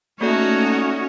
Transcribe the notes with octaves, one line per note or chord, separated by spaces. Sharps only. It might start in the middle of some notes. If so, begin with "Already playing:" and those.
A3 A#3 C#4 D#4 F#4 A4 C#5 D5